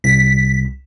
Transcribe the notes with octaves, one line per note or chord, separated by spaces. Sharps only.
C2 B6